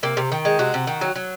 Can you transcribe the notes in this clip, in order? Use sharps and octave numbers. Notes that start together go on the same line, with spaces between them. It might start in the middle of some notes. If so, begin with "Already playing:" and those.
C3 A#3
C3
D#3
G#3
C3 F#4
C3
D#3
F#3
F#3